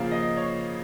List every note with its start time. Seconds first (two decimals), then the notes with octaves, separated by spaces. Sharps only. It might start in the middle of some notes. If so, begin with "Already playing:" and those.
Already playing: C#3 F3 A#3 F5
0.11 D#5
0.37 C#5